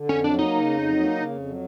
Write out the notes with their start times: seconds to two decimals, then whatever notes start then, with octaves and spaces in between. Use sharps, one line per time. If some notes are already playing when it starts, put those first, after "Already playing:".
Already playing: D3
0.09 F2 C#4
0.24 F#3 D4
0.39 A#3 D#4
0.55 C#3
0.69 F2
0.84 F#3
0.99 A#3
1.15 C#3
1.30 F2
1.45 F#3